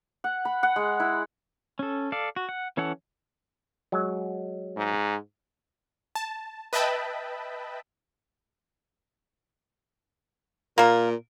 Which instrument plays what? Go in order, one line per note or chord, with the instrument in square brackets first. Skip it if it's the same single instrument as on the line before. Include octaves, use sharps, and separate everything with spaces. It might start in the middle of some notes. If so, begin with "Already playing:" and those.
[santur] F#5
B5
F#5
G#3
E4
[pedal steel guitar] C#4 A4
A4 D5 F5
F#4
F#5
E3 C#4 A4 C#5 F#5
[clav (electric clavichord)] F#3 G#3
[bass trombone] G#2
[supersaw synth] A5
B4 D#5 E5 G5 A5 B5
[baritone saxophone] A#2 [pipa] A#3 A#4